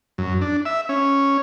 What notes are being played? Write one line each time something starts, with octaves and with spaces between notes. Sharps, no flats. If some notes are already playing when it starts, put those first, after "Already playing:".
F#2
D4
E5
C#4